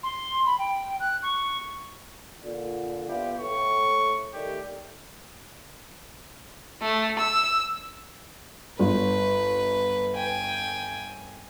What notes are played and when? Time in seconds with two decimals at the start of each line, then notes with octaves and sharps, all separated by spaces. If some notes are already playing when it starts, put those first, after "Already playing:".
0.03 C6
0.45 B5
0.58 G5
1.00 F#6
1.23 C#6
2.43 A#2 D3
3.08 B3 E4 F4 G4
3.39 A2 C#6
4.33 D#3 G3 A3 G4
6.82 A3
7.19 E6
8.79 G1 B4
10.16 G5 G#5